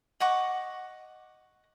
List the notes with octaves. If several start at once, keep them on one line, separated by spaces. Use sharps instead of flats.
D#5 F#5 C#6 D6